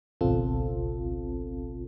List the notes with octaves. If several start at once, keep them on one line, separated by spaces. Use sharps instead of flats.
G#1 C#2 B2 C4 F4 A4